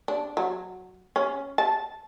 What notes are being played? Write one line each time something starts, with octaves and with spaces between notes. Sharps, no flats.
D4
F#3
C#4
A5